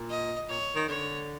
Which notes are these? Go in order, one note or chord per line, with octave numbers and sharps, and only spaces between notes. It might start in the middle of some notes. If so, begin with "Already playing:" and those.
Already playing: A#2
D#5
A#2 C#5
D#3
D3 C#5